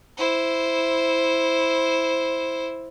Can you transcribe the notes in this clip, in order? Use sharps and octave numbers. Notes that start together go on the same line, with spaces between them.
E4 C5